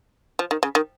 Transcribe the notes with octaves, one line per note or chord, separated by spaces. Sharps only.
F3
D#3
C#3
D#3